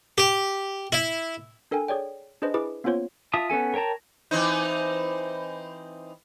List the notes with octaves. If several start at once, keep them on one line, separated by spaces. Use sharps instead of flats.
G4
E4
D4 A4 A#4 G5 G#5
G#4 C#5 D5 G5
D4 G#4 B4 C5 D#5
E4 G#4 B4 D6
A#3 B3 C#4 F4 C5 C#5
F4 E5 A5 D#6
B3 C#4 A4 G#5
A#4 C#5 G5 A5 A#5
E3 C4 D#4